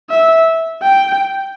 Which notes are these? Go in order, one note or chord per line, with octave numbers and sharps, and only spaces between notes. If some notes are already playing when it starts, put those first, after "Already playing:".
E5
G5